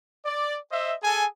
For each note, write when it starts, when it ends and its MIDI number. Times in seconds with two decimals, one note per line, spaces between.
0.25 0.56 74
0.71 0.94 72
0.71 0.94 75
0.71 0.94 76
1.03 1.24 68
1.03 1.24 69
1.03 1.24 80